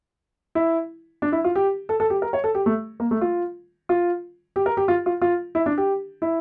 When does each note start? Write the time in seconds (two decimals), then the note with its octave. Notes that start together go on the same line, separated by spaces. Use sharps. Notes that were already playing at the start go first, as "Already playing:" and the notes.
0.55 E4
1.22 D4
1.32 E4
1.44 F4
1.56 G4
1.89 A4
2.00 A4
2.10 G4
2.22 A#4
2.33 C#5
2.44 A4
2.55 G4
2.66 A3
3.00 A#3
3.11 A3
3.21 F4
3.89 F4
4.56 G4
4.66 A#4
4.77 G4
4.88 F4
5.06 F4
5.22 F4
5.55 E4
5.66 D4
5.78 G4
6.22 E4